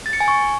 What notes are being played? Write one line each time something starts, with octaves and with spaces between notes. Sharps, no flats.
A6
C#7
G#5
C#6